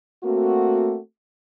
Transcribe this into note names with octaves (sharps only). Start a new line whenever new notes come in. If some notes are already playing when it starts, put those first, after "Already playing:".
A3 A#3 C4 F#4